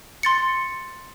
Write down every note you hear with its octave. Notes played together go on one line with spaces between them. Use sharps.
C6 A6 C#7